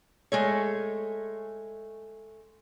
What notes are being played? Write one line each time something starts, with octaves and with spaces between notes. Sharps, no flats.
G#3 A3 C#5